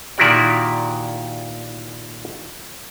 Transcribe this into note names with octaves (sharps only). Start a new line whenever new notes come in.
A#2 D#3 E4 F#4 G4 D5